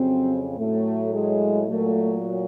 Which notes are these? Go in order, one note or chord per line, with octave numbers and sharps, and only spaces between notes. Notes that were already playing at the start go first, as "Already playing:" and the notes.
Already playing: F2 C#3 F#3 C4
A2 F#3 A3
G#3
A#2 F#3 A3